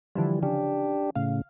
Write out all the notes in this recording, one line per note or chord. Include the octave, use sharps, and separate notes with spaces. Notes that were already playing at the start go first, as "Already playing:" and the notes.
D3 E3 F3 G3
C#3 D4 G4
A2 C#3 F5